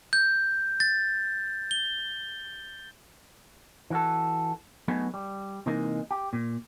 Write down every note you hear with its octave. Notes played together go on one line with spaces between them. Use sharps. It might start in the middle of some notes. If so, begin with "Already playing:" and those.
G6
A6
G7
E3 F#4 A4
F#3 A3 B3 D#4 F#4 G#4
G3
C3 E3 G#3 A#3 D#4
G4
A#2